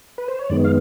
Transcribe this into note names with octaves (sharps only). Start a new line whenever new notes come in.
B4
C5
C#5
F#2 D#3 G#3 B3 D5
F5